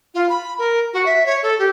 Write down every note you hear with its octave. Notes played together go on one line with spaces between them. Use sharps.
F4
B5
A#4
F#4
E5
C#5
A4
G4